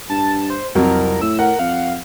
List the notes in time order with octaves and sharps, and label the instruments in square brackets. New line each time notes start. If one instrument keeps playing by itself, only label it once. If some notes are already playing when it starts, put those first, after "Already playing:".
[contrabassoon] G2 [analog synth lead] A5
[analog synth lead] C5
[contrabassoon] C2 [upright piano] F2 F#3 [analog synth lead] A#4
[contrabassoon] A2 [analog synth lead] E6
[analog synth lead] A#4 [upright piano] F#5
[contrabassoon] F2 [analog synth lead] F5